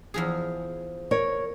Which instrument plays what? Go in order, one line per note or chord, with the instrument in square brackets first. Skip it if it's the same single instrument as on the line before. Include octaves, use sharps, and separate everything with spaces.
[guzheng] E2 F3 G#4
[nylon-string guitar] A#4 C#5